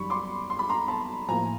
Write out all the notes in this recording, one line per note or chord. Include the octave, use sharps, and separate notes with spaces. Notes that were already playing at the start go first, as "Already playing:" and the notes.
Already playing: F#2 D#3 G3 B5 C#6
C6 D6
C6
B5
A#5 C6
A5 B5
A2 F3 A#3 G#5 A#5